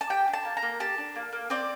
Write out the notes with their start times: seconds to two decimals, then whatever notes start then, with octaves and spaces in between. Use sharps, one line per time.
0.01 A5
0.10 G4 G5
0.28 D4
0.34 A5
0.45 A#3
0.57 A#5
0.62 A#3
0.80 G4 A5
0.98 D4
1.15 A#3
1.33 A#3
1.50 C4 D5